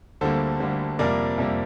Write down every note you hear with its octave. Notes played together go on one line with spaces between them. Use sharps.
D2 D3 G3 A#3 A4 C5
D2 D3 G3 A#3
F2 C3 G3 A#3 A#4 D5
F2 C3 G3 A#3